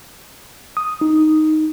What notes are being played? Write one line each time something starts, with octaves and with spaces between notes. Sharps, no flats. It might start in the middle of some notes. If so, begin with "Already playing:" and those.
D#6
D#4